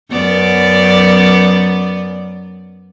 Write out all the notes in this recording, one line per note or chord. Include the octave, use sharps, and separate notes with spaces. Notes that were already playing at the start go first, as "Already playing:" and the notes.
F#2 B3 D5